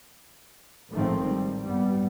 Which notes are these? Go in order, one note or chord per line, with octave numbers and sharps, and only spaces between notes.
A1 G#2 D#3 F3 A3 C4
G3
G2 G3 B3